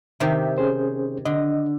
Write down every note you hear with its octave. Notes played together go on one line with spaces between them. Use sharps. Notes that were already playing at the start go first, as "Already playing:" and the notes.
C3 D#3 G4 E5
C#4 G#4 C5
D3 D#5